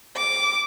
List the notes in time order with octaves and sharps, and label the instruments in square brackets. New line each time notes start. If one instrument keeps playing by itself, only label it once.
[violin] D6